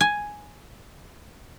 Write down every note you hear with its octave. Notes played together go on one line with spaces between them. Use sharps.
G#5